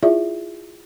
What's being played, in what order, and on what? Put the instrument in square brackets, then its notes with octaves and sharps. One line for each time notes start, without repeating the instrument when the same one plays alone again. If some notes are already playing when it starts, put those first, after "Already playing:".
[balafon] E4 F4 G#4 D5 E5